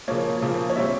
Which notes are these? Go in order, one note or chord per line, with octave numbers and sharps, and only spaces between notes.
C#3 F3 A#3 C#5
C#3 F3 A#3
C#5
A#2 G3 C4 E5